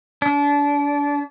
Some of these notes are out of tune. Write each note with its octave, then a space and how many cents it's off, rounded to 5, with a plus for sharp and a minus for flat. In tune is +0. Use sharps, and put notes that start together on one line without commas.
D4 -30